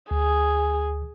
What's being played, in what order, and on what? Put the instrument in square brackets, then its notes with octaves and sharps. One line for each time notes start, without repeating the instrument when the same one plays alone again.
[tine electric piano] D2 [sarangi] G#4